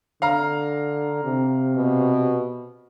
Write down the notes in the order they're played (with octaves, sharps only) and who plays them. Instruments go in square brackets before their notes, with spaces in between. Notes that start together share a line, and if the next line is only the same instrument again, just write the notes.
[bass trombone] D3 [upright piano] F5 A#5
[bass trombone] C3
[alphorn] B2